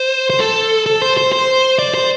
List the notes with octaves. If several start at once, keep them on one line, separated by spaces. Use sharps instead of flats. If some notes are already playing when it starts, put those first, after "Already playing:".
Already playing: C5
C5
A4
A4
C5
C5
C5
D5
C5